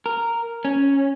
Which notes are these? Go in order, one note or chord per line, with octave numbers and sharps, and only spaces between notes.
A#4
C#4